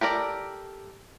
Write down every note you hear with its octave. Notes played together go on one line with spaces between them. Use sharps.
G4 A4 A#4 D5